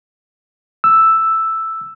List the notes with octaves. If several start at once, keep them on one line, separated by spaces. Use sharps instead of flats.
E6